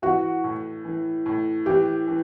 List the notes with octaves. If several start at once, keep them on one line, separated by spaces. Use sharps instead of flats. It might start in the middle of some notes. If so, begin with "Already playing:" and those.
E3 F#4
A2
E3
A2
E3 G4
E3